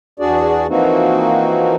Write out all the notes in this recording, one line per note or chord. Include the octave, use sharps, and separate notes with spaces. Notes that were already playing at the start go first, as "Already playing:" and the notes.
E2 D4 F#4 G#4 D5
E3 F3 A#3 C4 D#4 F#4